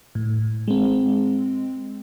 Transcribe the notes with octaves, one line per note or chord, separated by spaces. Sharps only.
A2
G#3 C4